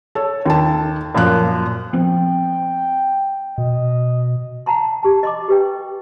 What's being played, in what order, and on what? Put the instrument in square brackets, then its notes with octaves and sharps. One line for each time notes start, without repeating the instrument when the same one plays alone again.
[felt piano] A4 C#5
D#2 A5
F#2 A#2 F3 F#6
[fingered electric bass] F3 B3 C4 [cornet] G5
[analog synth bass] B2 [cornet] D#5
[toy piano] F#5 A5 A#5 C6
G4 A5
D#5 C6 D6
G4 B4 G5